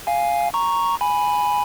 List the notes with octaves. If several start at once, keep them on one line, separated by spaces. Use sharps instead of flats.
F5 G#5
A#5 C#6
G#5 B5